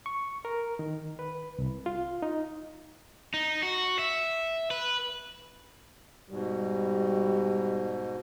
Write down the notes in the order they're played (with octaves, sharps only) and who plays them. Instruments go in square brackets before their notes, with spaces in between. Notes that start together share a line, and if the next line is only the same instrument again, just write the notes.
[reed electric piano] C#6
A#4
D#3
B4
C2
F4
D#4
[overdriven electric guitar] D#4
F#4
E5
B4
[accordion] G#2 B2 [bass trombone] G3